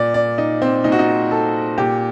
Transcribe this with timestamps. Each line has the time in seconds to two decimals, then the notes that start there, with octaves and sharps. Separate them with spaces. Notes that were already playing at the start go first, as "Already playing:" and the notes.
Already playing: A#2 D5
0.14 D5
0.38 D#4
0.62 C4
0.84 A#2 D#4
0.92 F#4
0.99 D#4
1.31 A4
1.78 A#2 G4